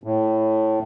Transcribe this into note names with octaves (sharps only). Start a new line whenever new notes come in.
A2